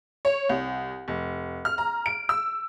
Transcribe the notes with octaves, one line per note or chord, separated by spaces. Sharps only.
C#5
C2
F1
F6
A#5
D7
E6